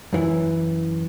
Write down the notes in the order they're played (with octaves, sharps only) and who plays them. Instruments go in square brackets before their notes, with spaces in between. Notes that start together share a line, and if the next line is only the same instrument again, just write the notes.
[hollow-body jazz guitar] F#2 E3